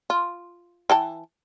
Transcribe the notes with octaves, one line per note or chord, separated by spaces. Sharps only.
F4
E3 G5 A5